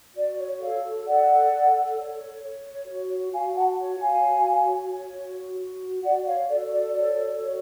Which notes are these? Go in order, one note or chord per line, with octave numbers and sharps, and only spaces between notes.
F#4 D5
C#5
A4 C#5 F5
A4 D5 F#5
A4
C#5
C#5
F#4
F#4 F5 G#5
F#5 A5
C#5
F5 G#5
F#4
C#5
F#4
F#4
F#4 D5 F#5
C#5 F5
A4 D5
D5
C#5 D5
F#4